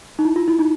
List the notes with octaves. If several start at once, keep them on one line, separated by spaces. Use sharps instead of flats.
D#4
E4
F4
E4
D#4